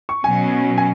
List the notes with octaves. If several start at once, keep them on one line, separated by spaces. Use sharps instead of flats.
C#6
B2 F#3 C#4 G#5
G#5